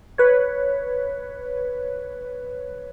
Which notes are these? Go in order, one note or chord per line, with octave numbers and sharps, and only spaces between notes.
B4 C#5